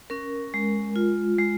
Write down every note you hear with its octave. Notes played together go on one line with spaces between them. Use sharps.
C#4 A#4
G#3
F4
G#3